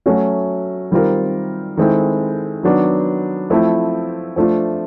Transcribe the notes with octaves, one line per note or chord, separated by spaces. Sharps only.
F#3 A3 C#4 F#4
D#3 G3 C4 F4 A#4
D#3 G#3 C4 E4 A4
D#3 F#3 B3 D4
F3 A3 C4 E4
F3 A3 D4 F4